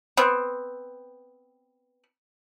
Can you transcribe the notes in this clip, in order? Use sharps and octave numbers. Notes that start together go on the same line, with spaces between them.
B3 C4